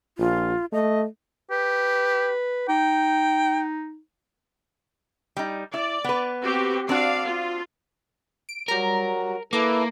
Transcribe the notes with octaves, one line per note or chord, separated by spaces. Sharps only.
A#1 F4
A3 D#5
G4 B4
D#4 G5
G3 D#4
E4 D5
B3 B4
C4 F#4 G4
C4 D4 F#4 D5 F5
F4
D7
F#3 G3 A#4 A#5
A#3 E4 A4 B4 D6